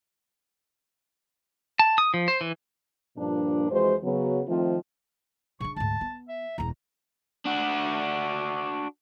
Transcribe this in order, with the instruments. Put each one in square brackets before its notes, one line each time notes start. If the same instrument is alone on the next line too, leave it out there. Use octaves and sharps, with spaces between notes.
[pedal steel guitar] A5
D#6
F3
C5
E3
[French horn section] G2 A#2 F3 A#3 D4
F2 E3 G#3 F#4 C5
C#3 F#3 B3
D#3 F3 A3 C4 D#4 F4
[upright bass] C#3 D4 [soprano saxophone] C#6
[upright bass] D2 G#2 [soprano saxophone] A5
[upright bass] B3
[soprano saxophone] E5
[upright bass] E1 E2 [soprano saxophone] A#5
[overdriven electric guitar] D4 F#4